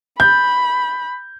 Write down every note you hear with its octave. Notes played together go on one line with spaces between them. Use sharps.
B5 G6